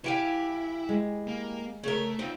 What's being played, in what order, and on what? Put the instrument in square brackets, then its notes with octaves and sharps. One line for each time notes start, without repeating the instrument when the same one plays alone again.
[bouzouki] E3 G4 F5 [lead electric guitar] E4
[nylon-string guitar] G#3
[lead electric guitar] A#3
[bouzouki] C#3 A#4 [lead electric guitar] A3
[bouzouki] C4 [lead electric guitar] D#4 F4